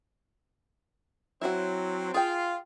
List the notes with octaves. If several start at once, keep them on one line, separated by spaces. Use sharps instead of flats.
F#3 C4 E4 F#4
F4 G#4 G5